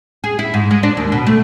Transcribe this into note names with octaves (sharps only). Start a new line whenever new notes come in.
G#4
E4
G#2
G#3
D4
D#2
B2
A3